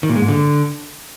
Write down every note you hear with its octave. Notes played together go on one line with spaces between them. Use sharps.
D#3
A#2
G#3
G#2
D3